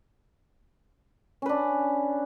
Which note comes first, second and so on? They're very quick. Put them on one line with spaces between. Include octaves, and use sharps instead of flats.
C#4 B4 D4